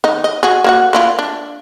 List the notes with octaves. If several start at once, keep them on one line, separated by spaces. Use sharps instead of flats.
D#3 D#4
D#5
F#4 G#4
A#3 F#4 F#5
A#3 E4 F4
D4